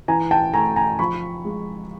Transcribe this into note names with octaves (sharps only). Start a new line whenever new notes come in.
E3 G#5 A#5
G5 A5
A3 G#5 A#5
G#5 A#5
F3 B5 C#6
G#3